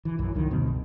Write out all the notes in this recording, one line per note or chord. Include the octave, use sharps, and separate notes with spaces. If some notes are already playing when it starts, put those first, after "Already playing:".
E3
A#1 F#2 E3
C2 F#2 D#3
D2 B2 C4
C2